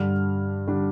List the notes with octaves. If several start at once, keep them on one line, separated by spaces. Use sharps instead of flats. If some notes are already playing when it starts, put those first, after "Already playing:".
Already playing: G2 D3 G3 D4 F6
D3 G3 D4